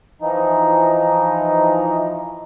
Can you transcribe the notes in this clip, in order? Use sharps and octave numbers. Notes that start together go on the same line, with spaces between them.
E3 F3 D#4